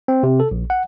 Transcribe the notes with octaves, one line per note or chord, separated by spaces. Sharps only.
C4
C3
A4
A#1
F#5